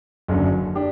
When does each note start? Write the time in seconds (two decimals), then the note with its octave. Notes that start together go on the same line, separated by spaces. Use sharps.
0.28 F#1 F#2 D3
0.75 D4 G4